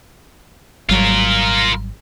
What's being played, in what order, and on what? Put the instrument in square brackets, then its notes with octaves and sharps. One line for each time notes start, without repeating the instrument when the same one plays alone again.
[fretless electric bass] G#1 F#3 G3 [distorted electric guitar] F4 A#4